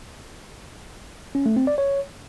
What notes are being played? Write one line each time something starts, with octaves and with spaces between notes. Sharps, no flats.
C#4
A3
C4
D5
C#5